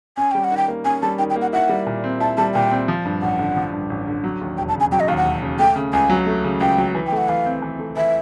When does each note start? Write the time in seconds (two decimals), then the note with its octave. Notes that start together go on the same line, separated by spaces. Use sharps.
0.17 C#4 G#5
0.31 G3 G5
0.44 F#5
0.51 D#3
0.57 G5
0.68 A#3
0.85 C#4 G#5
1.02 G3 A5
1.19 D#3 G5
1.30 G5
1.36 A#3
1.42 F#5
1.53 E4 F#5
1.69 G3
1.87 A#2
2.04 C4
2.20 E4 A5
2.37 G3 A5
2.54 A#2 G5
2.71 C4
2.88 F3
3.05 G2
3.22 A1 F#5
3.39 D3
3.57 F3
3.73 G2
3.90 A1
4.07 D3
4.24 F#3
4.41 D#2
4.58 E1 G5
4.69 A5
4.75 C#3
4.80 G#5
4.92 F#3 G5
5.00 D#5
5.08 D#2 F5
5.17 F#5
5.25 E1
5.42 C#3
5.59 A3 G5
5.76 C#3
5.93 C#2 G#5
6.10 F#3
6.26 A3
6.44 C#3
6.61 C#2 G5
6.78 F#3
6.95 E3
7.07 G5
7.12 A3 F#5
7.29 E3 F5
7.46 C4
7.62 E3
7.79 A3
7.97 E3 E5